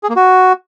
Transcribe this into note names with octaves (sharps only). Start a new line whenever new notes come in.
G#4
A#3
F#4